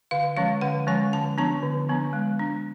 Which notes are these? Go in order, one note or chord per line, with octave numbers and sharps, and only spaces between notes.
D3 F5
F3 G#3 C#4 F5
D3 F#5
F3 G#3 C#4 G#5
D3 A5
F3 B3 D4 A5
D3
F3 B3 D4
G#3
D4